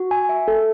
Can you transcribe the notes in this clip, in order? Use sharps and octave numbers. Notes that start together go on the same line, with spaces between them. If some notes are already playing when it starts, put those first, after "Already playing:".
Already playing: F#4
G#5
E5
A4